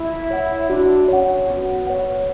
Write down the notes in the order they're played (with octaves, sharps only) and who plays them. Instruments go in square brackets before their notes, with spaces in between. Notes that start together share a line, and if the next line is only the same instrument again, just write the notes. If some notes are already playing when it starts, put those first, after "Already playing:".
Already playing: [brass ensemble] E4
[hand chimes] C#5 F#5
[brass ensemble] D4 [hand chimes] F#4
[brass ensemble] C#4 [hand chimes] C#5 F#5
[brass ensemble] B3 [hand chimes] F#4
[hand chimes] C#5 F#5